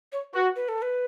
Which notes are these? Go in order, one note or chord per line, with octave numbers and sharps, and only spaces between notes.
C#5
F#4 B4
B4
A4
B4